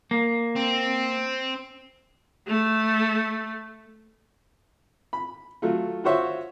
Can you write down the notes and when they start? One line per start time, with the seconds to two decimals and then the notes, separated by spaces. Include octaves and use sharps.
0.11 A#3
0.56 C4
2.48 A3
5.13 B5
5.62 F#3 A3 F4
6.04 F4 F#4 C5 C#5 E5